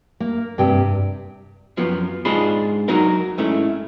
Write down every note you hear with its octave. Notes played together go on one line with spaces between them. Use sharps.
A#3
G2 C3 G4 G5
F#2 F3 B3
G#2 D4 F4 G#4 C5 B5
F#3 D#4 F#4 A#4 F5
G#2 A3 C#4 E4